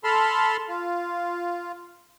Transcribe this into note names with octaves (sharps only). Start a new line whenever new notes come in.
A4 A5 B5 C6 F6
F4